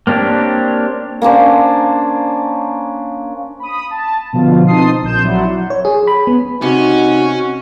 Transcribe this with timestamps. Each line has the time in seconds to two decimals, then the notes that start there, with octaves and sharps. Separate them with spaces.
0.07 A#3 C4 D4 G4 C#5
1.22 A#3 C#4 D4 C5
3.60 B5 D#6
3.91 A5
4.33 B2 D3 F3 F4
4.67 C4 D#4 A5 C6 D#6 C7
5.02 A#1 C6 G6 E7
5.24 F#3 E4 D5 F#5
5.70 C#5
5.85 G#4
6.07 B5
6.27 B3
6.62 C3 C#4 D#4 F#4